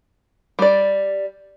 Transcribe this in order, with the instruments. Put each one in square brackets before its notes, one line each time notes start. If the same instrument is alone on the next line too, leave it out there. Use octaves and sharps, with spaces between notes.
[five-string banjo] G3 D5